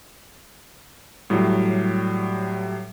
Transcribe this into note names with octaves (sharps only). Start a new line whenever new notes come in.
A2 F#3 G3